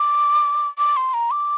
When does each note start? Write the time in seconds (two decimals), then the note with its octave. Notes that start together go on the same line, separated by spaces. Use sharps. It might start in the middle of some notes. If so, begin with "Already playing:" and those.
Already playing: D6
0.78 D6
0.97 C6
1.14 A#5
1.31 D6